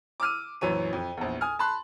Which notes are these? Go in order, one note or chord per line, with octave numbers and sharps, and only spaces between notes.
D6 E6 F6 D#7
A#1 F#2 E3 C#5 D#7
F2
A#1 E2
G#5 D#6 F6
A5 B5 C6 F#6